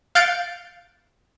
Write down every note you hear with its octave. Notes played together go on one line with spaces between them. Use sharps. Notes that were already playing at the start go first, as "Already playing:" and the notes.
F5 F#6 G6 A6 C#7 D7